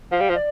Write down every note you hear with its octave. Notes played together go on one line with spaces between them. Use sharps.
F3 F5
G3
F3
D5